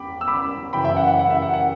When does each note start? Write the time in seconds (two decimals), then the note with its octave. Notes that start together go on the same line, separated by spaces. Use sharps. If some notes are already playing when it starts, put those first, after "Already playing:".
Already playing: E2 G5 B5 D6
0.21 E6
0.28 B5 D6
0.73 F#2 C#3 E3 G5 B5
0.85 E5 G5
0.96 F#5
1.08 F#5
1.19 F#5
1.30 E5
1.42 F#5
1.53 F#5